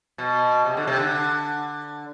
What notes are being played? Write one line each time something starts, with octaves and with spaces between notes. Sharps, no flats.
B2
C3
D3
C3
D3